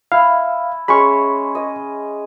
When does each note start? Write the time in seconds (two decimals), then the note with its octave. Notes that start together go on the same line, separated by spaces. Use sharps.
0.12 E4 F5
0.88 G#3 C#4 B5 C#6
1.55 D#5